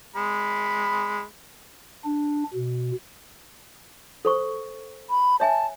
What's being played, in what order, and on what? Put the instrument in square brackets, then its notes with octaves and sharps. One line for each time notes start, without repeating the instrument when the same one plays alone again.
[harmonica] G#3 B5
[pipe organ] D4
B2
[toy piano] A4 C5 C#6
[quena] B5
[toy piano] C#5 E5 G#5 [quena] A5